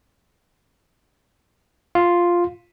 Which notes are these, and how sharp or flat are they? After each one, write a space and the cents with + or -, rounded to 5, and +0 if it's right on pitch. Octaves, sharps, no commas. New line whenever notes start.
F4 +0 F5 +0